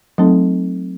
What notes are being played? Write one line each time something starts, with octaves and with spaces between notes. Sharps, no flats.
F#3 A3 C4 D#4 A4